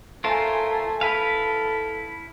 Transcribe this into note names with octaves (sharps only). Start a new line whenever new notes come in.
A3 F4 A#4 C5 G#5
E4 A4 B4 F5